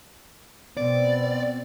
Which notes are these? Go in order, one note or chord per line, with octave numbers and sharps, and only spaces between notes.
B2 B3 C4 D5